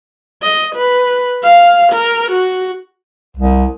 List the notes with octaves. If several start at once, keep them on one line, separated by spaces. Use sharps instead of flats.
D#5
B4
F5
A#4
F#4
C2